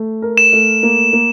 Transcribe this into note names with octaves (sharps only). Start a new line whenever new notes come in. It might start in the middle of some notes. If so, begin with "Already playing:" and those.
Already playing: A3
A#4
E7
A3
A#3
A#3